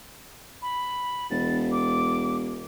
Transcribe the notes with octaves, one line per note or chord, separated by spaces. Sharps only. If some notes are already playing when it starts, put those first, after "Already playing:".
B5
E1 A6
D6